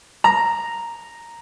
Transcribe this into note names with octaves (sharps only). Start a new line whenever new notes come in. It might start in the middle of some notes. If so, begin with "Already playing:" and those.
A#5